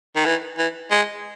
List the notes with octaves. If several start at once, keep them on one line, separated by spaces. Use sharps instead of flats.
D#3
E3
E3
G#3